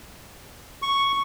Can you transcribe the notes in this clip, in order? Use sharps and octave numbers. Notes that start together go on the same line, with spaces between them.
C#6